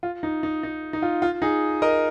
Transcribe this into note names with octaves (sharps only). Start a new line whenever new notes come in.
F4
D#4
D#4
D#4
D#4
F4
F4
D#4 G#4
A#4 D#5